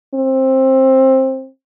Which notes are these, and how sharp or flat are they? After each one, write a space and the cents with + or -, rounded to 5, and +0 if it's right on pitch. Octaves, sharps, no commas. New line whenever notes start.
C4 +15